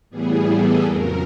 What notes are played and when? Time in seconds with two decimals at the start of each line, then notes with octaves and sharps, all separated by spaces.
0.10 A2 E3 G3 B3 G#4
0.47 A4
0.83 F2 C#3 F#3 A#4